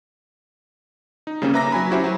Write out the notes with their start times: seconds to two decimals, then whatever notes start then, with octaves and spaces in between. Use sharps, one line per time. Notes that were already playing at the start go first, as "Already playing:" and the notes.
1.27 D#4
1.42 C#3 G3 A#3 C4 C#4
1.54 B4 E5 A#5 D6 A#6
1.72 F#3 G#5 B5
1.91 C#4 E4 F#4 G4 C5 E5
2.04 F#3